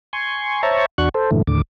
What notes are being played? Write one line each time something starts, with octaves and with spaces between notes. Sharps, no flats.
G#5 C6 C#6
C5 C#5 E5 A5 A#5 C#6
E2 D4 F#4 C#6 F#6
A4 C5
G2 A#2 D3 E3 A3
D#2 A2 D3 D6